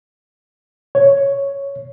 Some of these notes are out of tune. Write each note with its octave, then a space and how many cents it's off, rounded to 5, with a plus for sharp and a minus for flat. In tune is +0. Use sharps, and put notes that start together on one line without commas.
C#5 +0